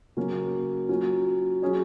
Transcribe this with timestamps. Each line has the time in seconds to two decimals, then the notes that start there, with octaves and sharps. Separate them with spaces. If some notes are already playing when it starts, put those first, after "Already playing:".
0.17 C#3 F#3 A#3 C#4 F#4
0.89 F#3 C#4 F4
1.62 F#3 C#4 G#4 C#5